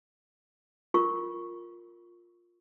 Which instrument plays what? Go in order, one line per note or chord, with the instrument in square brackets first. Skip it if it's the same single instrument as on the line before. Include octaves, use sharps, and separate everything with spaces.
[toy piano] F4 A#4 C#6